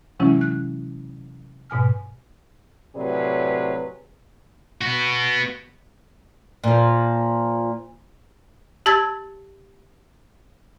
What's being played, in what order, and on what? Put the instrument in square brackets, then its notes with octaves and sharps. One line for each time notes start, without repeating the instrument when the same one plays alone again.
[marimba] C3 E3 F#3 G#3 C#4 E4
F#6
G#2 B2 G#5 F6
[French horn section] A2 C3 F#3 G#4 B4 D5
[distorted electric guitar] B3 F#4
[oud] A#2 F3
[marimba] G4 A5 E6 G#6 A6